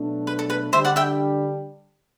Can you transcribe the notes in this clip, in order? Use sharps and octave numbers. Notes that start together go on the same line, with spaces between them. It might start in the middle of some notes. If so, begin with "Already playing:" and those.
Already playing: B2 F#3 A3 D4
B4
A4
B4
D3 G3 D4 G4 C5 E5
D5 F#5
E5 G5